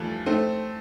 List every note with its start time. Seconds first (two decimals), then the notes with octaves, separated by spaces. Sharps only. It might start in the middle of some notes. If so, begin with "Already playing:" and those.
Already playing: E3 F3 G3 A3
0.26 A3 C4